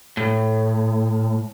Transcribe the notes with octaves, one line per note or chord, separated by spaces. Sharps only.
A2